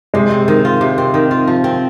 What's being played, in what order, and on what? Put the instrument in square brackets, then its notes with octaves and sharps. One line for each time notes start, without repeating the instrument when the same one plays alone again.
[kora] C3 [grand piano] G#3
[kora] C4
D#3
F4
C3
C4
D#3
F4
F3
C4